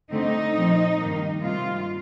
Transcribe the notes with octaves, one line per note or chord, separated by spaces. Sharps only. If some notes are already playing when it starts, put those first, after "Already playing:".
D3 A3 C4 D#4
A#2 F3 C4
G2 D#3 A#3
C3 G3 A#3 F4